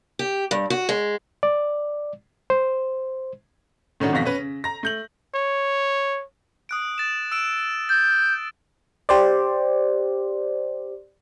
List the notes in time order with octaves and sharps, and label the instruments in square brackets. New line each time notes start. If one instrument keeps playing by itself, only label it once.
[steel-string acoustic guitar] G4
G2
F#4
G#3
[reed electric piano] D5
C5
[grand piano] A2 D#3 C#4 D4 F#4
A1 F2 B2 F5 A#6 B6
C#4 B4
C#3
A#5 A#6
A3 G6 F#7
[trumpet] C#5
[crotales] D#6 F#6 D7
A6 E7
E6 D7 E7
[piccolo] G6 [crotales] A6
[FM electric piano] G4 C5 D5